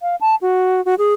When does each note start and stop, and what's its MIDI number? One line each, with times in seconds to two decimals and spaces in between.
0.01 0.16 77
0.21 0.35 81
0.41 0.83 66
0.85 0.95 66
0.98 1.14 68